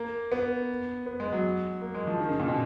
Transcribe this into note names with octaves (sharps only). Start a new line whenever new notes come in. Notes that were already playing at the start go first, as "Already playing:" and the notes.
Already playing: A#3
B3
B3
G#3
F#3
A#3
G#3
F3
D#3
C#3
A#2
B2